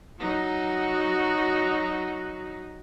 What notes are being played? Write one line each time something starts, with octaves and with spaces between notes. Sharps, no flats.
F#3 D#4 F#4